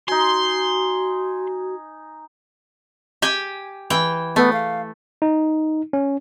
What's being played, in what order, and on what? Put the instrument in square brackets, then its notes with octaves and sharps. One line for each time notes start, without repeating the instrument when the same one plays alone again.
[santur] D#4 G#5 [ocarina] F#4 [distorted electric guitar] C6
[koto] G4 G5 G#5
E3 G5
[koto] A3 [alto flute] B3
[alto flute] F5
[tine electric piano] D#4
C#4